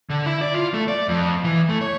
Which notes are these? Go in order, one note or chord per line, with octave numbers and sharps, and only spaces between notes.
D3
E4
D5
F4
A3
D5
F2
E3
A3
C#5